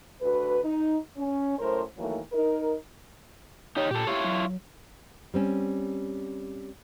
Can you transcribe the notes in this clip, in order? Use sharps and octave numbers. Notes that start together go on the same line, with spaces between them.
D2 F#4 B4
D#4
C#4
F#2 A2 A#4 C5
D#3 E3 F#3 A3 A#3
D#4 A#4
D#4 G4 C#5
A#2 G4 A4
E4 F4 G4 C#5
F#3
G3 C4 C#4